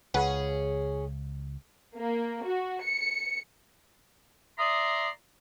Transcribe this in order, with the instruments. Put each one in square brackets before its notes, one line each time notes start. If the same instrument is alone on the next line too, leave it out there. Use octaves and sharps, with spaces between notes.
[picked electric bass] C#2 [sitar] C#4 G#4 [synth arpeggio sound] B4 F#5
[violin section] A#3
F#4
C#7
[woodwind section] D5 E5 A#5 C6 D#6